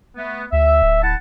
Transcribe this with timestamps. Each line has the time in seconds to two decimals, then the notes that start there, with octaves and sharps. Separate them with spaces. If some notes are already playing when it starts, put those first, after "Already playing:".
0.17 A3 B3
0.52 D2 E5
0.82 D1
1.02 E4 F#5 A5